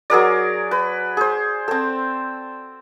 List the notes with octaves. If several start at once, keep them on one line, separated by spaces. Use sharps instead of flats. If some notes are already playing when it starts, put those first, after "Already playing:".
F#3 G#4 A#4 D5
B4
G#4 C5
C4 A4